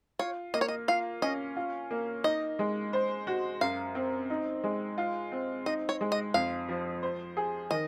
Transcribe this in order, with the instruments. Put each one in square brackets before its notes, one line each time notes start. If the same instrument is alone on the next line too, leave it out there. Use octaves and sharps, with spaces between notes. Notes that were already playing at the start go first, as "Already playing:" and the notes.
[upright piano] F4 [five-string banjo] C#5
[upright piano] A#3 [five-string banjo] D#5
[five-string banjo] C#5
D#5
[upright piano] F4 [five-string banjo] F5
[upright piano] C#4 [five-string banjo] D#5
[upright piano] F4
A#3
[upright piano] D#4 [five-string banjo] D#5
[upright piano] G#3
C5
F#4
[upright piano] F#2 [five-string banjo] F5
[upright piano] C4
D#4
G#3
F4
C4
[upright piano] D#4 [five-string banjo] D#5
[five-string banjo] C#5
[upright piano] G#3
[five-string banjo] D#5
[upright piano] F2 [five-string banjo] F5
[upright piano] F3
C5
G#4
[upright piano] D#3 [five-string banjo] D#5